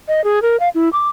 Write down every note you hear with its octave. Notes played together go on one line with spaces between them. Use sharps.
D#5
G#4
A#4
F5
E4
D6